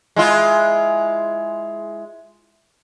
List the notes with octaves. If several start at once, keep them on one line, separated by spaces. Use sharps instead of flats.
G#3 E4 F4